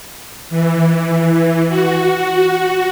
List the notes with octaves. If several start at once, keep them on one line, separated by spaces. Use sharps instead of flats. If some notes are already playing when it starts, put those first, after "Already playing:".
E3
F#4